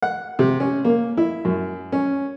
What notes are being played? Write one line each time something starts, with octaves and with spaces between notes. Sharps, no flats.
F#5
C3
C#4
A#3
E4
F#2
C#4